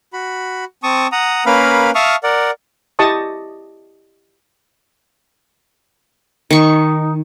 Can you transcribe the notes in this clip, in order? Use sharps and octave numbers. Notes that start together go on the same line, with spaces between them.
F#4 B5
C4 A5 C#6 D#6
F#5 A#5 D#6
A#3 C#4 A#4 B4 F5 B5
E5 F5 A5 C#6 D#6 F6
A#4 D5 F#5
E4 G4 D#5 A5 C#6 D#6
D#3 D#4 C#6